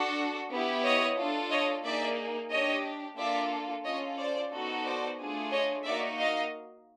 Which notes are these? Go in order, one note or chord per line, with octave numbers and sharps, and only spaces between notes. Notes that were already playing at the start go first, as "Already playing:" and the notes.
Already playing: D4 F#4 A4
B3 E4 G4
C#5 D#5
D4 F4 A4
C#5 D#5
A#3 D#4 G#4 D5 E5
D4 G4 C#5 D#5
A#3 D4 F4 A4 D5 E5
C#4 F4 A4 C#5 D#5
C5 D5
B3 D#4 F#4 A4
C5 D5
A3 D4 F4 G#4
C#5 D#5
A#3 D#4 F#4 D5 E5
D#5 F5